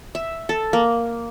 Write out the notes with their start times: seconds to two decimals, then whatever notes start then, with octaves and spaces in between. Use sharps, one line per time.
0.15 E5
0.49 A4
0.73 A#3